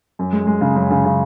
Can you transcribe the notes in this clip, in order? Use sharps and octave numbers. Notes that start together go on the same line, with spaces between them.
F#2
G#3
G#3
C#3
F#2
C#3
C#3